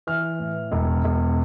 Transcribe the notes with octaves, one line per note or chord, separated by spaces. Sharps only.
E3 F6
A2
E1
E1